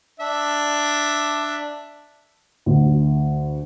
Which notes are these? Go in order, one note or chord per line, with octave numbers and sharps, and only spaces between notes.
D4 E5
D2